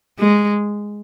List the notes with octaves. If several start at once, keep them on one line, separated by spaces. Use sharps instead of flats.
G#3